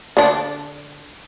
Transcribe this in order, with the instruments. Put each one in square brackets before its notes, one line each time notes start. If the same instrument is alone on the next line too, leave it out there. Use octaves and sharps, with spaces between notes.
[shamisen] D3 D4